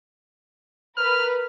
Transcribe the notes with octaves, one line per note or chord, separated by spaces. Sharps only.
A#4 B4 F6